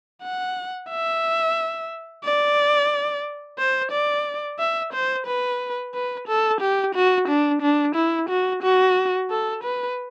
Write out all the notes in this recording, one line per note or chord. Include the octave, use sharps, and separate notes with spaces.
F#5
E5
D5
C5
D5
E5
C5
B4
B4
A4
G4
F#4
D4
D4
E4
F#4
F#4
A4
B4